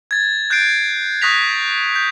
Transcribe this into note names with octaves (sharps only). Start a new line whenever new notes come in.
G#6 A6
F#6 G6 A6 C7 D7
C#6 D#6 F#6 A#6 B6 F7
G6